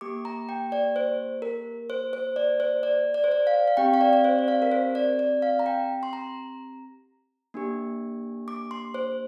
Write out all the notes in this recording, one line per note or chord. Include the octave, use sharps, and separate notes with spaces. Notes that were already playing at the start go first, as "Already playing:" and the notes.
A#3 G4 D6
A#5
G5
D5
C5
A#4
C5
C5
D5
C5
D5
D5
C5
D5
F5
F5
C4 G4 G5
F5
D5
D5
C5
D5
F5
A#4
C5
D5
D5
F5
A#5
G5
C6
A#5
A#3 D4 G4
D6
C6
C5